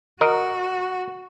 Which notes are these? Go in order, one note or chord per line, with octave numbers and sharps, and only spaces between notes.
F#4 A#4 D#5